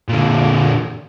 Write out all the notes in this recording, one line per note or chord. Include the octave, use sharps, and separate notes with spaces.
A#2 D3